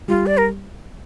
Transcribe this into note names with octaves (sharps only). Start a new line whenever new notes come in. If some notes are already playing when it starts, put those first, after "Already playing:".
G3 F4
D5
A#4